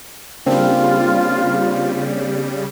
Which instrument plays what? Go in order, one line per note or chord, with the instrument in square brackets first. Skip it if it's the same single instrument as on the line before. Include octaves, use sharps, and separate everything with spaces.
[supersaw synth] C#3 G3 [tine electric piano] A#3 C4 D4 [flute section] F4